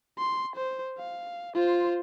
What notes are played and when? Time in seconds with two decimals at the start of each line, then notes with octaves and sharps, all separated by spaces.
0.18 C6
0.56 C5
0.98 F5
1.55 F4 C5